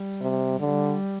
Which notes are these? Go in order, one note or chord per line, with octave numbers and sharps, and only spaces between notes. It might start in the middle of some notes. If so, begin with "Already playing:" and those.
Already playing: G3
C3
D3 G3